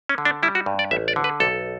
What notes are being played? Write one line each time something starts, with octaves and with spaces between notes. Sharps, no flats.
C#4
D3
D4
G3 E4
F#4
G2
D5
A1 E5
D5
D3
B4
B1 A4